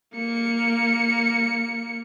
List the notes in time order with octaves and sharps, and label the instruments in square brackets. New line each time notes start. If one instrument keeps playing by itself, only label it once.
[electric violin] A#3 C#7